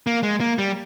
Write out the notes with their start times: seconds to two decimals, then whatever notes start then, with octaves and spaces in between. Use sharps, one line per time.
0.07 A#3
0.23 G#3
0.40 A#3
0.58 G3